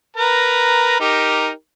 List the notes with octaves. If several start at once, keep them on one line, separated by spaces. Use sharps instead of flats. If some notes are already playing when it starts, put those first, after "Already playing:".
A#4 B4 A#5
D#4 G4 A#4